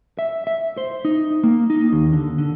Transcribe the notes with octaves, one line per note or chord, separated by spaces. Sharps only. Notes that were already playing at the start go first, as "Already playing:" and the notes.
E5
E5
C5
D#4
A#3
D#4
D#2
D3
D3